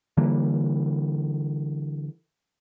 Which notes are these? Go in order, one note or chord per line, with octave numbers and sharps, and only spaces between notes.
D3 E3 G3 A#3